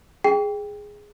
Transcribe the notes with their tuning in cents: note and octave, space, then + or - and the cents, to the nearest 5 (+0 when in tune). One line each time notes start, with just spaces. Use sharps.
G#4 +0 G5 +15